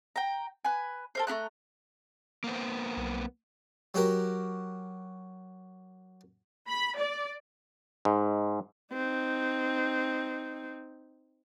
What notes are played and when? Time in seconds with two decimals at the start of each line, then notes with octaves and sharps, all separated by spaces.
0.16 G5 A#5
0.65 B4 G#5
1.15 A4 A#4 C5
1.27 A3 E4 A#5 F#6
2.44 A#3 B3 C5
2.97 B1
3.94 F#3 F#4 G4 A#4
6.68 B5
6.98 D5
8.05 G#2
8.92 C4 D#4